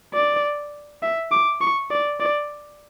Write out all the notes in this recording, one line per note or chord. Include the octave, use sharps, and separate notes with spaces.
D5
E5
D6
C#6
D5
D5